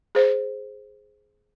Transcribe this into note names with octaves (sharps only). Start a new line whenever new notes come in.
G#4 C5